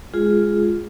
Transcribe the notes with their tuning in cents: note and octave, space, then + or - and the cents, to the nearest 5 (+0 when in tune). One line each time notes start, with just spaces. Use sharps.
G#3 +0 F4 +0 G#4 +0